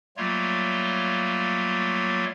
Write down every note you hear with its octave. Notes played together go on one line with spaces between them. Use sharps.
F#3 G3 A3 A#3 F4 C#5